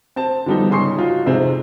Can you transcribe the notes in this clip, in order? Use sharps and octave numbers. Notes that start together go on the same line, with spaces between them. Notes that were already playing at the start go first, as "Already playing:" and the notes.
C4 A5
D3 F3 G3 B3 D#4
G#2 C#3 G#4 C6 C#6 C7
D#4 F4 F#4
F2 G#2 C3 G#3 C4